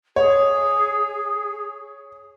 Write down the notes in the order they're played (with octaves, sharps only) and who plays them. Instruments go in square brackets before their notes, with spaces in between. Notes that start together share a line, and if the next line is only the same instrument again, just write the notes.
[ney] G#4 [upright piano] C#5